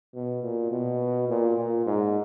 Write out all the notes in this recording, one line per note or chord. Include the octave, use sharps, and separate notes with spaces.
B2
A#2
B2
A#2
A#2
G#2